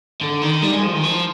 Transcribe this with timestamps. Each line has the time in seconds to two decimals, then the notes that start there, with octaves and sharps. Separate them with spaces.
0.21 D3
0.42 D#3
0.62 G3
0.73 G#3
0.82 F3
0.93 D#3
1.03 F3